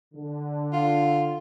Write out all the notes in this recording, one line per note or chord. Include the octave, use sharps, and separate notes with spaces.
D3
F4